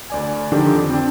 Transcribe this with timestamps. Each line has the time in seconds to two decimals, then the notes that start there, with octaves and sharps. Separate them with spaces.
0.10 D2 D5 G#5
0.52 D3 D#3 F3 D4 D#4 G4
0.73 F2
0.90 C4 D4